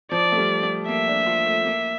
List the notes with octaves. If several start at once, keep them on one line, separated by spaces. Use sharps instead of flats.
F3 D5
A3
G3
A3
A#3 E5
D4
F4
A3
A#3